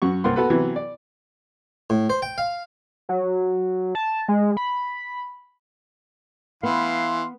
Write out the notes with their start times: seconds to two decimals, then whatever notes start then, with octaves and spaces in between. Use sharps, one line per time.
0.02 F#2 F#4 C#6
0.24 C2 A#3 F#5 C6
0.36 B3 F#4 A4 B4
0.50 C3 E3 F#3 B3
0.76 D5
1.90 A2
2.10 C5
2.22 G5
2.38 F5
3.09 F#3
3.95 A5
4.28 G#3
4.57 B5
6.63 E3 B3 F5 C6